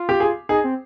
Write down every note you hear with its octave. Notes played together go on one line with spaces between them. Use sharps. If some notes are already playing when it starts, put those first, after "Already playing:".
Already playing: F4
G4
G#4
D#4 G#4
C4